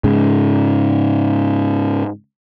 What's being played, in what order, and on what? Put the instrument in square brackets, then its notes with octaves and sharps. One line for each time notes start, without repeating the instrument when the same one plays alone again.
[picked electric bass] G#2 C#3